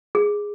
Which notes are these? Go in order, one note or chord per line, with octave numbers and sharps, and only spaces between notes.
G#4